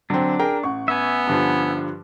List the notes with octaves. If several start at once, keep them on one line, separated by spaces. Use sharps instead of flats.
D3 F#3 C4 D4
G#4 A#4 G5 A#5
A1 F#5 C#6
B3 E5 G#5
G2 D3 F3